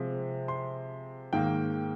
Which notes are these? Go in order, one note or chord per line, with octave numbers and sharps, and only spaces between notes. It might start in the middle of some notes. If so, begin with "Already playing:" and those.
Already playing: C3 F3 G#3
C6
G#2 D#3 A#3 G5